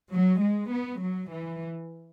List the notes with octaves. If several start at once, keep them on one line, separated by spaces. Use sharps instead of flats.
F#3
G#3
B3
F#3
E3